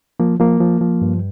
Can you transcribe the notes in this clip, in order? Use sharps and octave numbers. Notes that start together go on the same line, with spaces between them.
F3 A#3
F3 A#3
F3
F3
G2